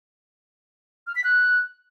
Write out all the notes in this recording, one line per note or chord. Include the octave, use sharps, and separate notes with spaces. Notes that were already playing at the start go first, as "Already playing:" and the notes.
F6
B6
F#6